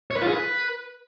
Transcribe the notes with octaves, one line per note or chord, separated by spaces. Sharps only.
C#5
B4
F4
G#4
B4